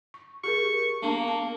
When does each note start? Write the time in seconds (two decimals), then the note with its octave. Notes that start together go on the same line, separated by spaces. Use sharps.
0.14 C#6
0.44 G4 G#4 A#4 C#6
1.02 A#3 B3 D4 A5
1.28 A5